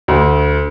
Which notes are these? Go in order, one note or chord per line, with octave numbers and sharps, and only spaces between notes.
D2